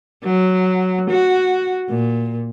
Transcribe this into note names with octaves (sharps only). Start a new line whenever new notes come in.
F#3
F#4
A#2